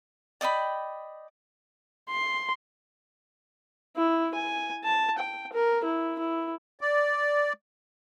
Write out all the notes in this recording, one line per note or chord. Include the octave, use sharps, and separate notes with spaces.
D5 D#5 G5 B5
C6
E4
G#5
A5
G5
A#4
E4
E4
D5